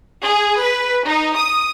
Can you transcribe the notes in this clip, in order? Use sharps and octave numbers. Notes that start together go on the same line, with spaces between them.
G#4
B4
D#4
D#6